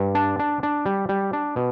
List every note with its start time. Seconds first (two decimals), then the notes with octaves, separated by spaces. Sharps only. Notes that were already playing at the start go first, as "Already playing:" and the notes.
Already playing: G2
0.15 D4 A5
0.39 D4
0.63 D4
0.86 G3
1.09 G3
1.33 D4
1.56 B2